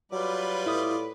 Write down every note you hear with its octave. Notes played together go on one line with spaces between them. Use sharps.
F#3 G3 F4 B4 D5
A2 E4 D#6